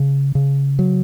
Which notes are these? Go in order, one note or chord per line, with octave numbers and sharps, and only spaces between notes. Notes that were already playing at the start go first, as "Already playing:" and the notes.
Already playing: C#3
C#3
F#3